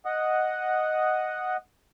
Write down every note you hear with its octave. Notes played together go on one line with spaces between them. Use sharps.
D#5 F#5 D#6